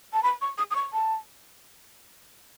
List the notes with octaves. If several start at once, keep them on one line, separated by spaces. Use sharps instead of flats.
A5
B5
C#6
D#6
D#6
C#6
A5